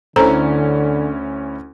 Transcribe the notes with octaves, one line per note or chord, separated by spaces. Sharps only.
D2 D3 C#4 E4 A4 C5 A#5